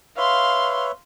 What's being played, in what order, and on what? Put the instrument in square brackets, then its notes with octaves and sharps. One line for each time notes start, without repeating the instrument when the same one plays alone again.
[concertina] B4 C#5 E5 [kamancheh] F5 C6